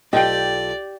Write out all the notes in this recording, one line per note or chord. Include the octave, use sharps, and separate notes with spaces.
B1 F4 G4 A4 D5 D#5 G5